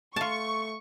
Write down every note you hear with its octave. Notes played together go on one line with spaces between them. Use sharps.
A3 F4 A5 C#6